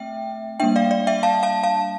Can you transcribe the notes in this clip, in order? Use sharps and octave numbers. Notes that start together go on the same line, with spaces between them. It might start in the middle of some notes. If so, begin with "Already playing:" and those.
Already playing: A3 C4 E5 G5
G3 A#3 D4 E5 G5
D5 F5
D5 F5
E5 G5
F5 A5
F5 A5
F5 A5